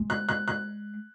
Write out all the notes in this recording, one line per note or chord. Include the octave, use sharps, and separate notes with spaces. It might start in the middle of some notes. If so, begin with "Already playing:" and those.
Already playing: G#3
F#6
F#6
F#6